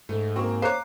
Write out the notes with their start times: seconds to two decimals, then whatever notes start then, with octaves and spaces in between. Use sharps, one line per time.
0.09 G#2 A3
0.36 A#3 C4 F#4 C#6
0.62 C5 C#5 F5 A#5 D6 F#6 C7